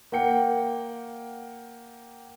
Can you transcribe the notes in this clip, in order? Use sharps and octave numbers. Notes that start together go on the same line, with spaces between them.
A#3 F#5 G5 C#7